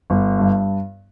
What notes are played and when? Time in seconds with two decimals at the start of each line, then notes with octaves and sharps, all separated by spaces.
0.10 G1
0.39 G2